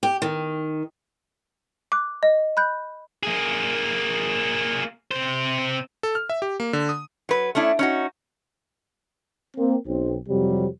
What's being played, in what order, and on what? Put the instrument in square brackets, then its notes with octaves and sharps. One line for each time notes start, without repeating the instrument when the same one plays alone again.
[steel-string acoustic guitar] G4
D#3
[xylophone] D6 F#6
D#5
B5 F#6 G6
[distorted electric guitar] A#3 G#4
C3 C5
[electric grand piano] A4
F6
E5
G4
A#3
D3
D#6
[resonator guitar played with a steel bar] F#3 B4
A3 C#4 D4 E4
C#4 D#4 F#4
[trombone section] A#3 C4
B1 C4
F2 C3 F#3 G3